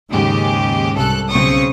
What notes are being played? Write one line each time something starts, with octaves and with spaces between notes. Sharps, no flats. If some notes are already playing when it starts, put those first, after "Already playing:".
D#2 G#2 C#3 G#3 G4
C2 A4 F#6
B1 C#3 C4 C#6 D#6